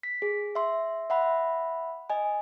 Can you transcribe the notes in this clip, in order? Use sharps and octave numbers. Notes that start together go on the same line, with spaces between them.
B6
G#4
E5 C6
E5 F#5 B5
D#5 G#5